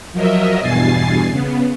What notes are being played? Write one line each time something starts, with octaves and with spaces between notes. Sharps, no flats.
F3 F#3 A#4 D#5 E5
E2 G2 B2 G#5 A6 C7
C#3 B3